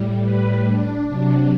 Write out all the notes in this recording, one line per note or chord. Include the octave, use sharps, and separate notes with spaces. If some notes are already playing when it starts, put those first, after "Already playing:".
Already playing: A2 G3
B4
D4
C3 F#3 D4